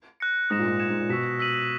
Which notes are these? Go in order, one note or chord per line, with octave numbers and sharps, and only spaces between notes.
F#6 A#6 C#7
G#2 D#6 F#6 A#6 E7
A#2
G#2
G#6 C#7 E7
G#2
A#2
B2 C#6 E6 B6 E7
E6 B6 D#7 F#7